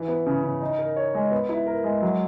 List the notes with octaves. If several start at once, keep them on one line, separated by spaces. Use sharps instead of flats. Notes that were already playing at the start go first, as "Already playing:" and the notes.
Already playing: E3
B3
C#3
C#3
D#4
A#4
C#5
G#3
B3
E4
A#4
G#3
F#3